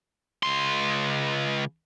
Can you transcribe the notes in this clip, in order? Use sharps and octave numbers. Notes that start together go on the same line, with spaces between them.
C#2 C6